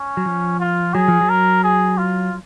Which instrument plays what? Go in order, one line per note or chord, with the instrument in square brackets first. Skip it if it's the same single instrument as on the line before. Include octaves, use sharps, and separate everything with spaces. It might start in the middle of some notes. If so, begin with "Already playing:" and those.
Already playing: [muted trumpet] C#4
[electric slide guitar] F#3
F3
[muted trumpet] F4
[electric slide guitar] F#3 [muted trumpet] G#4
[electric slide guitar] F3
F#3
[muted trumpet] A#4
G#4
F4